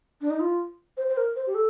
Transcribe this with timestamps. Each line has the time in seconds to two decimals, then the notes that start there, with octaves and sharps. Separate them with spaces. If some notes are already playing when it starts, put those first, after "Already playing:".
0.21 D4
0.30 D#4
0.40 F4
0.97 C5
1.09 C5
1.17 A#4
1.36 C5
1.47 G4
1.55 A4